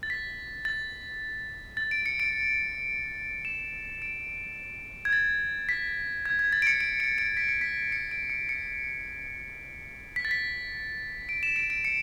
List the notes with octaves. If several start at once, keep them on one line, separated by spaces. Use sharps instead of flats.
A6
B6
A6
A6
D7
C#7
D7
E7
D7
G#6
A6
B6
G#6
G#6
A6
D7
C#7
D7
D7
D7
B6
C#7
B6
C#7
D7
C#7
C#7
B6
A6
B6
D7
E7
D7
D7
C#7